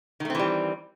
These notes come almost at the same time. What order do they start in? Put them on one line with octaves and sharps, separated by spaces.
D#3 A3 C4 E3 G3